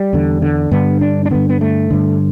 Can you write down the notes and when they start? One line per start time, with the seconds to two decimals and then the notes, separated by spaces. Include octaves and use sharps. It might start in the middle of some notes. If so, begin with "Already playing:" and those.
Already playing: G3
0.13 E2 D3
0.42 D3
0.72 G2 D3 B3
1.01 D4
1.25 D4
1.31 G2 D3 B3
1.50 B3
1.61 A3
1.90 G2 D3